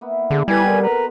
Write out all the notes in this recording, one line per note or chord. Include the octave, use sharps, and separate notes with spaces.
A#3 B3 E4
D3 G#4
F#3 G3 D#4 E4 A4 B4 G#5 G#6
C4 A#4 D5
B3 B4 A#5